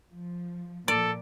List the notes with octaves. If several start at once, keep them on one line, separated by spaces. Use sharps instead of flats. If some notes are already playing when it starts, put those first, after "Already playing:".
F3
A#2 F3 A4 D5